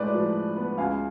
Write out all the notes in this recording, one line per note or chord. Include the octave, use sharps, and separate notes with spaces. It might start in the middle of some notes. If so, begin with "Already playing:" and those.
Already playing: A2 G#3 B4 D5
F3
D4
B3
C#2 F5 G#5